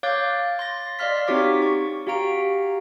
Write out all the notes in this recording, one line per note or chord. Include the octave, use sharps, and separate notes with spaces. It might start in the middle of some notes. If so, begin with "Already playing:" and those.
C#5 F5 D6 F#6 G6 A6
C6 A6 A#6
D5 D#5 F5 C6 F6 B6
C4 D#4 F#4 G4 C#5 D6
C#6
F#4 G4 F5 A#5 D7